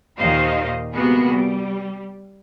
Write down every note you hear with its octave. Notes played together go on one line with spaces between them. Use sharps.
D#2 A#2 D#3 C5 D#5 F5
C3 G#3 A#3 B3 F#4 G#4
G3